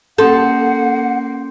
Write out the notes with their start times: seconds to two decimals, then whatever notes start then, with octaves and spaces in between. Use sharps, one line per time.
0.18 A#3 C#4 A4 F#5 C6 G6